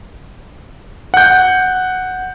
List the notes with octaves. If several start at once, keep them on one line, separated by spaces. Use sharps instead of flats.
F#5 G6